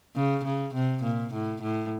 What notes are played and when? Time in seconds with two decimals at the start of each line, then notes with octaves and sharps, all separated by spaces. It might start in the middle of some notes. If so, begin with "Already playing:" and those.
0.16 C#3
0.44 C#3
0.74 C3
1.03 A#2
1.34 A2
1.62 A2